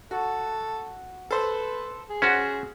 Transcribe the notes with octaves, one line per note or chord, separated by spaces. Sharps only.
F#4 A4
A4 B4 C5
G#4
C#4 F#4 C5 F#5